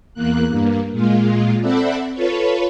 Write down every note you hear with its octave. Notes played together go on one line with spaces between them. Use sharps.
E2 A#3 F#6
G2 A#3
A#2 G#3 F4
C4 A4 D5 E5 F#5 B5
F4 A4 B4 C#5